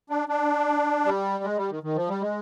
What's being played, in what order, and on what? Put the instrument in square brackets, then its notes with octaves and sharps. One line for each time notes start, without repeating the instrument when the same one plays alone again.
[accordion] D4
D4
G3
G#3
G3
D#3
D#3
F3
G3
G#3